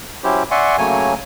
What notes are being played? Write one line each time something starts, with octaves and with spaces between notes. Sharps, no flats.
F#3 C#4 E4 G4 C5
D5 E5 F#5 G#5 C6 C#6
C#3 F#3 A3 A#3 C#5 G#5